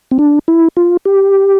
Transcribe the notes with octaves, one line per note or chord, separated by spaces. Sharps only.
C4
D4
E4
F4
G4